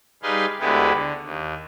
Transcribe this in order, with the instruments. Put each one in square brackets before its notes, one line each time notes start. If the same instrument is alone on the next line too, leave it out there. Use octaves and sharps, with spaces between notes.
[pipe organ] G3 D#4 G#4 B4 F5 C6
D2 D3 G#3 B3 E4 G4
D3
D#2